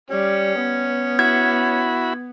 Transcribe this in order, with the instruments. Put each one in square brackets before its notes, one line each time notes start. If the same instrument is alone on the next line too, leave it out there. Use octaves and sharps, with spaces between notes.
[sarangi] G3 [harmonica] C#4
[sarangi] B3
[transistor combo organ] E4 F#4 B5 [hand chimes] G#6